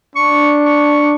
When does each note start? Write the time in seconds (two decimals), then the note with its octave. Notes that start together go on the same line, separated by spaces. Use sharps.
0.16 D4 C#6
0.65 C#6